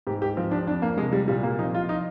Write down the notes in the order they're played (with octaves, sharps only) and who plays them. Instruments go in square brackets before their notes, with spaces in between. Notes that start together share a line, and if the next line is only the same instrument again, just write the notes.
[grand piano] G#2 G4
G4
F3 C4
D4
F2 D4
A#3
C3 G#3
G3
A#2 G3
A#3
F3 D#4
F4
D#4